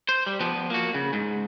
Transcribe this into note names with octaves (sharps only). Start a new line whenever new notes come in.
C5
G3
F3 B3
A#3 F#4
C#3
G#2